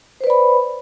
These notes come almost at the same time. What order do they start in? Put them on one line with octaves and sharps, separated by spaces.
C5 B4 D5 B5